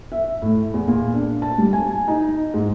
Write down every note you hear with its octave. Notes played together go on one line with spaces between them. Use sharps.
E5
A2
E2
A#2
D4
A5
G3
G#5
D#4
G#2